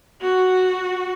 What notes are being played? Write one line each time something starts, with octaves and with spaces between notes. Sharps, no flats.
F#4